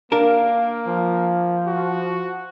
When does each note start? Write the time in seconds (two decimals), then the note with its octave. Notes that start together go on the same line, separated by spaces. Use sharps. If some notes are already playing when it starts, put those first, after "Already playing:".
0.12 A#3 D4 A#4 F5
0.87 F3
1.67 F#4